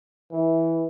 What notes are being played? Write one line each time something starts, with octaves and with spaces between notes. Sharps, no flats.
E3